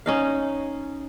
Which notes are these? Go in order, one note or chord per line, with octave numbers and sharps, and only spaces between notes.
C#4 D#4 F5